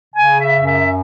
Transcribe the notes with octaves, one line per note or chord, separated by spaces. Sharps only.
C#3 G#5
E5
F#2
E5